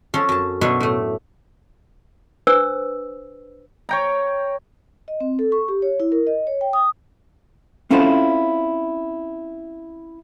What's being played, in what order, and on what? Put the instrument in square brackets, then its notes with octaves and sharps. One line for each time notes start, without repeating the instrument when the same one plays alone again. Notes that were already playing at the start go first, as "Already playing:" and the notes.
[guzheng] F3 C#4 A4
F#2 A5
B2 D4 B4 C#5 E5 C6
A2 A3
[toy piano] D4 B4 C5 E6
[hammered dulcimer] C#5 G5 A#5
[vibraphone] D#5
C4
A4
C#6
G4
C#5
E4
A#4
D#5
C#5
G5
D#6
[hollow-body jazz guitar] C4 C#4 E4 F4 A4 C5